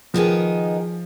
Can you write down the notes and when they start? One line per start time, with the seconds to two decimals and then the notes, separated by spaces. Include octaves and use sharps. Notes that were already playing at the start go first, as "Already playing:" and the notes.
0.14 D#3 F3 B3 D#4 G#4